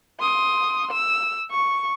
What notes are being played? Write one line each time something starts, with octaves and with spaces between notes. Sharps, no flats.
C6 D#6
E6
C#6